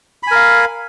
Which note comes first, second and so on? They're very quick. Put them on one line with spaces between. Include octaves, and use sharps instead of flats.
B5 G#5 A#4 F5